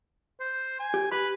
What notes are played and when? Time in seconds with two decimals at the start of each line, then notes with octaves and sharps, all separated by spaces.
0.40 C5
0.79 G#5
0.94 G4
1.12 G4 B4 B5